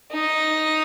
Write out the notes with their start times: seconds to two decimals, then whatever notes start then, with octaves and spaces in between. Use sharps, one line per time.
0.13 D#4